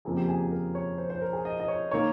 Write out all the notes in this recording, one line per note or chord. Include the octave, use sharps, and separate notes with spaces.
F2 C#3 F3 A#3 G#4
G4
G#4
G#4
A#4
C#5
C5
C5
A#4
G#4
D#5
D#5
C#5
D#3 A#3 C#5